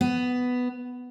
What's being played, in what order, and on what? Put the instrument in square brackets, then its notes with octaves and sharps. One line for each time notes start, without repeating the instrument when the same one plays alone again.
[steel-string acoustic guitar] B3